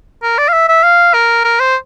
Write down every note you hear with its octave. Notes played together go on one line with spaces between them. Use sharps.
A#4
D5
F5
E5
E5
F5
A#4
A#4
C5